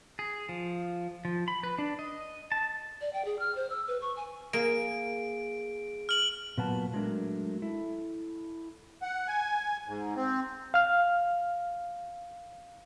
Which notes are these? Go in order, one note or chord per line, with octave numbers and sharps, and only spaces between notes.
G#4
F3
F3
B5
B4
D4
D#5
A5
D5
G5
G#4
F6
C5
E6
B4
C#6
G#5
A#3 G#4 G#5 D7
F6 F#7
A#2 F#3 B3 B4 F#5 A5
F#3 G#3 A3 D4 A#4
E4 A4
F#5
G#5
G#2
C4
F5 F6